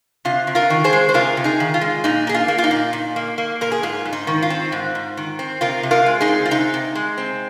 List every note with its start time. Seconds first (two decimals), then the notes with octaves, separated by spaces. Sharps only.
0.25 C3 F4
0.47 C3
0.55 F4 A#4
0.70 D#3
0.84 G#4 C5
0.93 G#3
1.09 C5
1.14 C3 F4 A#4
1.37 C3
1.44 D#4 G#4
1.60 D#3
1.74 F4
1.81 G#3
2.04 A#2 D#4
2.27 A#3 G#4
2.34 F4
2.48 A#3
2.58 F4
2.64 D#4
2.71 A#2
2.93 A#2
3.16 A#3
3.38 A#3
3.61 A#2 A#4
3.72 G#4
3.83 G#2 F4
4.05 G#2
4.13 D#4
4.27 D#3
4.42 F4
4.50 C4
4.72 G#2
4.95 G#2
5.17 D#3
5.39 C4
5.61 C3 F4 A#4
5.83 C3
5.91 F4 A#4
6.06 G#3
6.21 D#4 G#4
6.28 C4
6.45 F4
6.51 C3 D#4
6.74 C3
6.95 G#3
7.18 C4